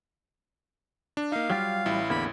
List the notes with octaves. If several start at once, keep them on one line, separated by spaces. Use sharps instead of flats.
D4
A#3 D#4 F5
F#3 G3 F4 G4
A1 E4
E2 D3 A#3 B5